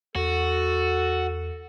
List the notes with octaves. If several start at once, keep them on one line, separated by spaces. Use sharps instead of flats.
E2 F#4 A4